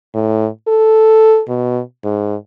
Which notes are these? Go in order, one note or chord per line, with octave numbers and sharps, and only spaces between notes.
A2
A4
B2
G#2